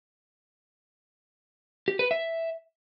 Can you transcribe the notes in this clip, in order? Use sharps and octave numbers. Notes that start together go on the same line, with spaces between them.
G4
B4
E5